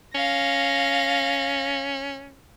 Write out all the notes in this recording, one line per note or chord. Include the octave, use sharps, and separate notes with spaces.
C#4 F5 A#6